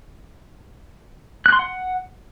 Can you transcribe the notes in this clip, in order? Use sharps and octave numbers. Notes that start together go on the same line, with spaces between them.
F#6
C6
F#5